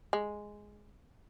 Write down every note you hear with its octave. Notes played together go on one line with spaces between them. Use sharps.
G#3